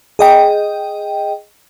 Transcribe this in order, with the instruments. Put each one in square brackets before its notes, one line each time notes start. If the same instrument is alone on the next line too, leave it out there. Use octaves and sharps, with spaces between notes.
[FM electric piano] G#4 D#5 G5